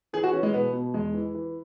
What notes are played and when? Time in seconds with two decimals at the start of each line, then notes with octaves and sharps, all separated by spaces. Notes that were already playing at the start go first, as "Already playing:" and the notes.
0.13 E3 G#4
0.24 F#4
0.33 E3 C#4
0.43 G#3
0.54 B2 B3
0.73 B2
0.94 E2 G#3
1.14 E3
1.34 E3